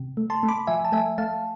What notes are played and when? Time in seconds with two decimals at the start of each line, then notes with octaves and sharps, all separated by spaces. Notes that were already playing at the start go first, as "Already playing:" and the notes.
Already playing: C3
0.17 A3
0.30 A5 C6
0.43 A3
0.48 B5 D6
0.67 F3 E5 G#5
0.85 A5
0.92 A3 E5 G#5
1.18 A3 F5 A5